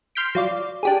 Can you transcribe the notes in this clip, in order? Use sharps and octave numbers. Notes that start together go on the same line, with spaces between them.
C6 F6 G6 B6 D7
F#3 F4 D5
D4 G4 G#4